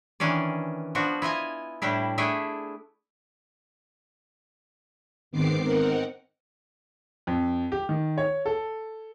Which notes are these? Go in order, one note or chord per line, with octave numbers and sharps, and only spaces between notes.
D#3 E3 C#4 D4 D5
F3 B3 D4 F#4
E4 F4 D#5 G#5
A2 G3 D4 E4
A3 D4 E4 G#4 G5
G#2 D#3 B3 C4 D6 C7
C4 D#4 A#4 F#5
F2
G4
D#3
C#5
A4